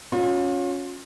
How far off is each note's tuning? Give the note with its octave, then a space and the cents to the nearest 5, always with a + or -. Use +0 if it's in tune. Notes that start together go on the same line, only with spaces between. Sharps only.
C#4 +5 F4 +40